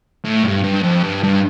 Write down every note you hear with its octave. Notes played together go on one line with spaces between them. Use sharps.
A2
G2
G2
F2
G2
G2